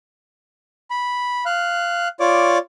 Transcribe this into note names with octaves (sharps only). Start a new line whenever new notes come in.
B5
F5 F#6
F4 C#5 D5 D6